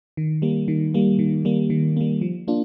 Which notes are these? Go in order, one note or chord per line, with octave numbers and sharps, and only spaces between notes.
D#3
G3 A#3
D#3
G3 A#3
D#3
G3 A#3
D#3
G3 A#3
F3
A#3 D4 F4